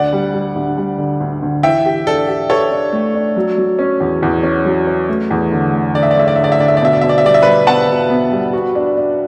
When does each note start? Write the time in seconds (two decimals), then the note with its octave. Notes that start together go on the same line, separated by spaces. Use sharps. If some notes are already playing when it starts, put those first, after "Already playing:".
Already playing: D2 D5 F#5
0.13 G3
0.34 G3
0.56 D2
0.77 G3
0.98 D3
1.20 D2
1.42 D2
1.63 E3 E5 G5
1.85 G4
2.07 D4 A4
2.28 G4
2.50 G4 A4 C#5
2.71 D4
2.93 A3
3.14 D4
3.36 F#3
3.58 F#3
3.79 C#4
4.00 E2
4.23 E2
4.43 C#4
4.65 F#3
4.87 C#4
5.09 A3
5.31 E2
5.52 D3
5.73 A3
5.94 D3 D5
6.03 E5
6.11 D5
6.16 A3 E5
6.28 D5
6.36 D3 E5
6.44 D5
6.52 E5
6.60 D3 D5
6.68 E5
6.77 D5
6.81 B2 E5
6.93 D5
7.01 B2 E5
7.09 D5
7.18 E5
7.24 G3 D5
7.34 E5
7.42 G3 B4 D5
7.67 B3 F#5 A5
7.89 B2
8.10 B3
8.32 G3
8.53 F#4
8.75 D4
8.97 D4